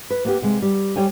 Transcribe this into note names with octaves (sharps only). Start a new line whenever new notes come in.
B4
A#3 B3 G4
C3 G#3
G3
G3 C#5 G5 G#5